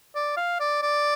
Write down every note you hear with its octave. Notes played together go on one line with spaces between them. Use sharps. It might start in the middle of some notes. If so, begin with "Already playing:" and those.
D5
F5
D5
D5